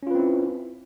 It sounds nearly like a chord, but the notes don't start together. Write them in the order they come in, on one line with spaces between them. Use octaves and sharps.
C#4 F4 B4 C4 E4